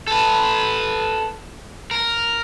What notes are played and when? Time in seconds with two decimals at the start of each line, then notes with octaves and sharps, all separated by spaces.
0.07 A4 B4
1.91 A#4